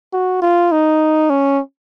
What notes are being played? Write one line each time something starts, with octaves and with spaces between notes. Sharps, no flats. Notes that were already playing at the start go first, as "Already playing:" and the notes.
F#4
F4
D#4
C#4